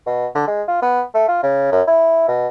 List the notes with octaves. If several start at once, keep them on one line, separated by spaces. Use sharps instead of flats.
B2
D3
G#3
F4
B3
A3
F4
C#3
F#2
E4
B2